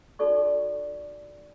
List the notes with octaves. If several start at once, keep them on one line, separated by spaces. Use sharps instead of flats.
D#4 F#4 A4 D5 C#6